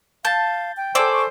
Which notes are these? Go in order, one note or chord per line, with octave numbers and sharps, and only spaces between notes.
F5 A5 G6 A6
G5
A4 C5 D5 G#5 E6
C#6